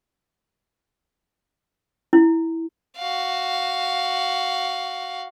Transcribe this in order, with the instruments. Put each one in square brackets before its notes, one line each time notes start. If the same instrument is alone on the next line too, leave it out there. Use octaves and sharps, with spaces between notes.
[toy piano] E4
[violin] F#4 F5